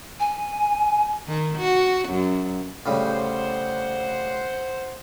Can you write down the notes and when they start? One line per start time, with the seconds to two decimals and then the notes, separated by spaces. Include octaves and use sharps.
0.20 G#5
1.28 D#3
1.58 F#4
2.09 F#2
2.86 A2 C#3 G3 C5 F#5